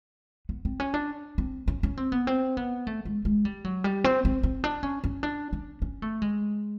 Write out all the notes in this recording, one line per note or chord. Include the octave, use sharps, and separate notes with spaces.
B3
C4
C#4
D4
C4
C#4
C#4
C4
B3
C4
B3
A3
G#3
G#3
G3
F#3
G3
C4
C4
C4
D4
C#4
C#4
D4
C#4
C#4
A3
G#3